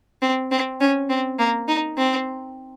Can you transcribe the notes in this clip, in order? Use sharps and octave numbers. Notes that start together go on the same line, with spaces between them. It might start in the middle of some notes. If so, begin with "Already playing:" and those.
C4
C4
C#4
C4
A#3
D#4
C4